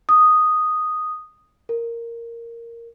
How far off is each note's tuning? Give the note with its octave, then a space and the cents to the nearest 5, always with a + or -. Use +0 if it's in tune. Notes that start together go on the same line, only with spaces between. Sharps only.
D#6 -5
A#4 -5